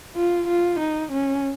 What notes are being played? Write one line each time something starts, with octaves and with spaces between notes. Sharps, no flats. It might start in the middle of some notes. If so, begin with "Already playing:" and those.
F4
F4
D#4
C#4